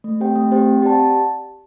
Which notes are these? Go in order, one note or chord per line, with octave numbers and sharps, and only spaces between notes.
A3
C4 G4 C5 G5
A3
C4 G4 C5 G5
C4
G4 D5 F#5 A5